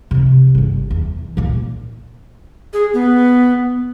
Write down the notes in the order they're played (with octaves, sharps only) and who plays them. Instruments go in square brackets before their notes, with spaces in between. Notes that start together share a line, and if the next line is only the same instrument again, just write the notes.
[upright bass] C3 F3
G1 G2
E2
A#2 A#3
[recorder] G#4
B3